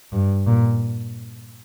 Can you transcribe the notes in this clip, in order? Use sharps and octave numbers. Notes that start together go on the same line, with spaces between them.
G2
A#2